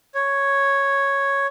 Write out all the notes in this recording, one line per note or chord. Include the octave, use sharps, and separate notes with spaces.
C#5